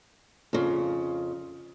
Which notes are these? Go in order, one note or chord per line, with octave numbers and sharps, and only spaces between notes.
F2 C#3